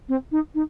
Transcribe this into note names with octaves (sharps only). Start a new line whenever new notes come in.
C4
D#4
D#4